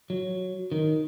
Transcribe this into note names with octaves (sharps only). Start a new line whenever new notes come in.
F#3
D#3